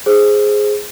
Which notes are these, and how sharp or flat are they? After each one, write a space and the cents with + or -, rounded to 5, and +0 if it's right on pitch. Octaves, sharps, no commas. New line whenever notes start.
G#4 +0 C5 +0